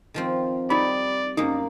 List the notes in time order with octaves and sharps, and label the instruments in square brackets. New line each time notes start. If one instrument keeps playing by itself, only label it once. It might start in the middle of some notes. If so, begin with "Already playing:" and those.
[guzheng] D#3 F3 C4
[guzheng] G3 [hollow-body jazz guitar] D#4 B5 [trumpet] D5
[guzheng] F#2 A#3 [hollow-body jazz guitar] D#4